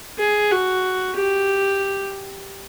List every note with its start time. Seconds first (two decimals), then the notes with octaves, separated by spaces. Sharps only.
0.19 G#4
0.51 F#4
1.16 G4